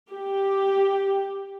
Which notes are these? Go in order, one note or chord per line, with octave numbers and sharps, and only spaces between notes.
G4